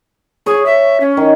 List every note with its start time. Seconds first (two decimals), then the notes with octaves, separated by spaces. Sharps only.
0.46 G#4 C#5
0.66 E5
1.00 C#4
1.17 D#3